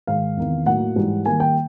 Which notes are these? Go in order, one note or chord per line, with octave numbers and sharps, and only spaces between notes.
G#2 D#3 G#3 F5
E2 C3 D#3
A2 F#3 A#3 D#4 F#5
G#2 E3 G3
D#3 G3 A#3 G#5
G5